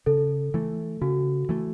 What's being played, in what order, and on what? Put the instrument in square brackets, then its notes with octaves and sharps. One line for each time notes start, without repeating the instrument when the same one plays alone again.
[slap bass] C#3 [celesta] A4
[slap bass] E3 A3
[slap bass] C#3 [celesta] F#4
[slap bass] E3 A3